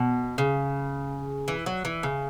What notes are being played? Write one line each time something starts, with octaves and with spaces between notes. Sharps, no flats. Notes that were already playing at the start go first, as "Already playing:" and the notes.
Already playing: B2
C#3
E3
F#3
E3
C#3